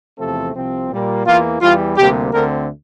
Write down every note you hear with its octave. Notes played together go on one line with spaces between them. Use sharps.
E2 C3 F3 A3 C4 A4
C2 C3 F3 C4
A#2 G3 A#3
E2 E3 A#3 F4
E2 E3 G3 F4
D2 C3 G3 A#3 G4
D2 D3 A3 C4 A#4